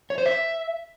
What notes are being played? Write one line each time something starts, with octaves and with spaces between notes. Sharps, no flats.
C#5
C5
E5